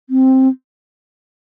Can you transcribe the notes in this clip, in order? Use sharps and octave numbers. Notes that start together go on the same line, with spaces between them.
C4